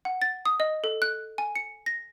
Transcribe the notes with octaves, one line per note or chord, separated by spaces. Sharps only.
F#5
A6
D#6
D#5
A4
F#6
G#5
C#7
A#6